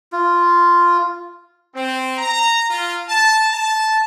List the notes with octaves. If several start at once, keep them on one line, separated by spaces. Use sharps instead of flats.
F4
C4
A#5
F4
A5
A5